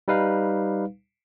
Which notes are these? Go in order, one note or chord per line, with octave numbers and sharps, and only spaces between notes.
G3 D#4 B4 F5